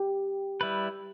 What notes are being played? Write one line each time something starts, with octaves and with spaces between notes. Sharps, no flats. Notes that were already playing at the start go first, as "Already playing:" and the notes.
Already playing: G4
G3 E4 B4